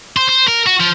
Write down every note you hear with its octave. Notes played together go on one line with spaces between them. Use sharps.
C5
C5
A#4
F#4
F3